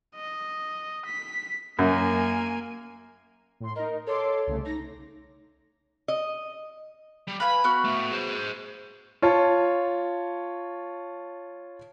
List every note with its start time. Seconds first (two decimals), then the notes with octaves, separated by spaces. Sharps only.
0.15 D#5
1.06 B6
1.79 F#2 A#3 G#5
3.60 A2 C6
3.76 D#4 A#4 D#5
4.07 A4 C#5 C6 D6
4.47 C2 C#3 A3
4.65 D#4 A#6
6.08 D#5
7.27 G3
7.40 B4 F5 G#5 B5
7.64 B3 F#4 F6
7.84 A2 A3
8.11 G#4 C5
9.22 F4 C#5 A5